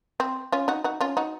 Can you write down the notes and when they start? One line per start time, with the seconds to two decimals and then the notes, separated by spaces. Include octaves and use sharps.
0.20 C4
0.52 C#4 F4
0.68 D#4 F#4
0.84 D#4 F#4
1.01 C#4 F4
1.17 D#4 F#4